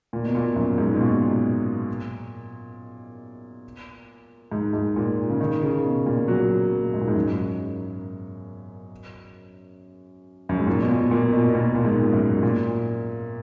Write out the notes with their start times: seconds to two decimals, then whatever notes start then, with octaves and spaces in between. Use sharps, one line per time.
0.13 A#2
0.25 B2
0.35 A#2
0.56 F#2
0.78 G#2
0.95 B2
1.01 A#2
4.52 G#2
4.73 G#2
4.96 A#2
5.30 C#3
5.40 D#3
5.62 C#3
5.84 B2
6.06 A#2
6.28 F#3
6.72 A#2
6.93 G#2
7.01 A#2
7.08 G#2
7.15 F#2
10.49 F#2
10.58 G#2
10.67 A#2
10.82 B2
10.89 A#2
11.11 A#2
11.33 B2
11.49 B2
11.55 A#2
11.75 A#2
11.85 G#2
12.13 F#2
12.43 A#2